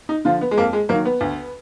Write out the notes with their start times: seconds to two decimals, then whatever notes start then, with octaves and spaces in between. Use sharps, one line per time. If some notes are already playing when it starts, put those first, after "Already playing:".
0.09 D#4
0.25 D3 F3 F4
0.41 B3
0.51 G#3
0.58 F2 A#3
0.73 G#3
0.89 D#3 F#3 A#3
1.05 B3
1.21 D2